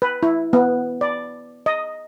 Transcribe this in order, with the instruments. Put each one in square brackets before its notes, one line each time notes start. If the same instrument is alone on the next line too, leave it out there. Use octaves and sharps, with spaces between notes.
[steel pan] B4
E4
B3
D5
D#5